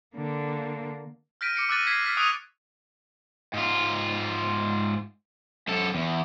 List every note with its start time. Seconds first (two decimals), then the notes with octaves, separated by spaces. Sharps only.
0.16 D3 A#3
1.41 F6 G6 A#6 B6 D7 D#7
1.55 D6 C#7 D7
1.69 D6 E6 F#6 A6 D#7
1.87 G#6 B6 C7
2.05 F6 B6 C7
2.17 C#6 D#6 F#6 D7 D#7 F7
3.54 G#2 F4
5.68 F#2 A4
5.95 E2